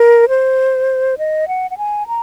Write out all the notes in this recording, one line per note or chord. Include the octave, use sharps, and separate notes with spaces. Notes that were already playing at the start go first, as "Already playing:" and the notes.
Already playing: A#4
C5
D#5
F#5
F#5
G#5
A#5